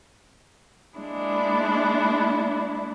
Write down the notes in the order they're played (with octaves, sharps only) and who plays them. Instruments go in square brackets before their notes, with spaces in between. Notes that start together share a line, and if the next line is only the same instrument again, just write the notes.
[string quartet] G#3 A#3 D4 E4 D5